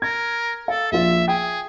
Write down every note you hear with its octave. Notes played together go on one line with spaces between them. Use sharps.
A#4 G#6
A4 F5
A#1 F3 F4 E5
G#4 G5